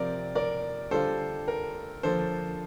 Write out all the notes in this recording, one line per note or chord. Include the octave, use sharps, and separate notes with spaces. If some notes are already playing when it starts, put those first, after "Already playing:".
Already playing: C3 F3 C4 A#4 D5
A#4 D5
D3 G3 D4 F4 A4 C5
A#4
D3 F3 A#3 A4 C5